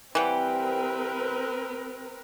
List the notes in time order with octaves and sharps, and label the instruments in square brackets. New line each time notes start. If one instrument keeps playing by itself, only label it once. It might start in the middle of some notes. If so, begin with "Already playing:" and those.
[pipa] E3 G3 [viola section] C4 A#4 B4 [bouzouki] G4 F#5 G5